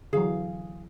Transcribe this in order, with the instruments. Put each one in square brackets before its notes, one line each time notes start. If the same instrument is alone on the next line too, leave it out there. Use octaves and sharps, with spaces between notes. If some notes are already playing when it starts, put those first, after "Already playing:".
[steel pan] D3 E3 F#3 [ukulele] G#4 F5